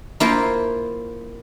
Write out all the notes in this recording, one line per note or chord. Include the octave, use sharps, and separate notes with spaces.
A#3 E4 F4 A#4 C5